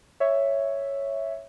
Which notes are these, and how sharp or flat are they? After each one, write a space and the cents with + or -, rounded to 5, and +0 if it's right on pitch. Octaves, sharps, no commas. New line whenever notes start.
C#5 +0 E5 +0